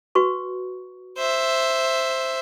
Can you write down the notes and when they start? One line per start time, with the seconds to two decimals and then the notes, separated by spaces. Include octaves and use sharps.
0.15 F#4 B4 C#6
1.18 C5 E5